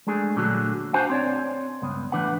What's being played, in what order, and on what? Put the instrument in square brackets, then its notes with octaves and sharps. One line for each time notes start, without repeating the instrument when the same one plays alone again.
[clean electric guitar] G#3 A3 D4 G#4
A#2 D3 F#3 A3 F#4
D4 F#4 C5 F5 F#5 G#5
C4 C#5 D5
C#2 G2 B3
A2 E3 D4 B4 F#5